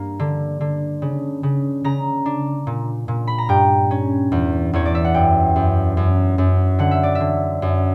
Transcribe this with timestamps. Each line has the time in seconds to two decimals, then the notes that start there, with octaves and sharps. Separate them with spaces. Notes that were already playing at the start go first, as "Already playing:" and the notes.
Already playing: G2 A#3
0.19 D3
0.61 D3
1.02 C#3
1.43 C#3
1.84 C#3 A#5
2.26 D4
2.67 A#2
3.08 A#2
3.27 B5
3.38 A#5
3.49 G2 G5
3.91 C#4
4.32 E2
4.73 E2 C#5
4.86 D5
4.95 E5
5.04 F#5
5.14 F#2 G5
5.56 F#2
5.97 F#2
6.38 F#2
6.79 D3 F#5
6.91 E5
7.03 D5
7.15 D3 E5
7.62 F#2